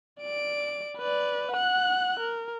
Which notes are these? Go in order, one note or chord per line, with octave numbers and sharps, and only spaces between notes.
D5 D7
B4 D5
F#5 F#6
A#4